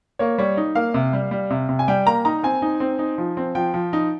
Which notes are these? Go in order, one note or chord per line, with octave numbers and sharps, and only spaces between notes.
A#3 C#5
G3 C#5
D#4
A#3 F5
C3
G3
G3
C3
C3
G#5
G3 G5
A#3 A#5
D#4 A#5
C4 G#5
D#4
C4
D#4
F3
C4
F3 G5
F3
D#4